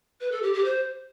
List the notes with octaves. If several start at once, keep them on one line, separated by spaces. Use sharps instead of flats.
B4
A4
G4
G4
C5